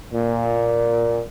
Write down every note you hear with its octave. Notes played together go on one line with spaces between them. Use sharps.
A#2